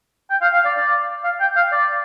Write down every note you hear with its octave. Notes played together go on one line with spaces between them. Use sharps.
G5
F5
F5
D5
D5
F5
G5
F5
D5